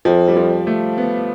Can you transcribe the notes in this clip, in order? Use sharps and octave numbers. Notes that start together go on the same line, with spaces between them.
F2 F3
G3
F3
A3
B3